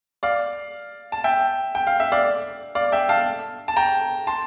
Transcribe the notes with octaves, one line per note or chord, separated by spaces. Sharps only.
D5 F5
A5
E5 G5
G5
F5
E5
D5 F5
D5 F5
E5 G5
F5 A5
A5
G5 A#5
A5 C6